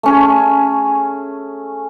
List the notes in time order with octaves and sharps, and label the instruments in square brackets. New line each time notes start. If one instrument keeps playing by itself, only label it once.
[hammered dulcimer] A3 C#4 G#4